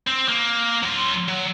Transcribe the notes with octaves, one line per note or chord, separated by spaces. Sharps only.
C4
A#3
F#3 C6
F#3